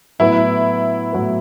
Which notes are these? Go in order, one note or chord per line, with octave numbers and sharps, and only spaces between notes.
A2 F#3 B3 E4 F#4 B4
A2 F#3 B3 F#4 B4